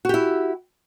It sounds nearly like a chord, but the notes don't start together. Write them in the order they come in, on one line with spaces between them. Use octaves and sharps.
F#4 G4 E4